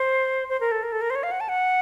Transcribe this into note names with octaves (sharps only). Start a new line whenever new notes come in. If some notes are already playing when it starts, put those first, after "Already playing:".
Already playing: C5
C5
A#4
A4
A#4
A4
A#4
C5
C#5
F5
F#5
A5
F#5